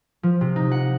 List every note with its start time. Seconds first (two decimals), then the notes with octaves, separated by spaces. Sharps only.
0.23 F3
0.41 C3
0.56 D#4
0.71 F#5